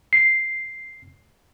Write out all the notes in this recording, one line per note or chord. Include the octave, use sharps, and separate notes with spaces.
C7